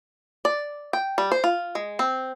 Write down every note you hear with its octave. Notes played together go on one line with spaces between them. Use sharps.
D5
G5
G3
C5
F4
G#3
C4